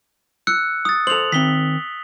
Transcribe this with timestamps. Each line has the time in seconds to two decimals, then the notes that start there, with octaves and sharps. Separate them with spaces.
0.47 E6 F#6 C#7
0.85 D#6 A6
1.07 A4 C5 F7 F#7
1.32 D#3 C4 B6 G7